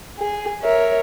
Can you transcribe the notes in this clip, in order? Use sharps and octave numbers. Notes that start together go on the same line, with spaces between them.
G#4
A#4 C#5 E5